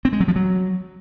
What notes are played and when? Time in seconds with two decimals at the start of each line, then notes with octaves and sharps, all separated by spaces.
0.05 C4
0.13 G#3
0.20 F#3
0.28 F3
0.36 F#3